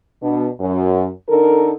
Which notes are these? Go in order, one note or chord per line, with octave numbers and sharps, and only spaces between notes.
B2 D4
F#2
D3 D#4 A4 A#4